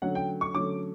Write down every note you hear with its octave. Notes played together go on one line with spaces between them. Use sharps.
D3 F#3 A3 C#4 F#5
G5
C#6
D3 F#3 A3 C#4 D6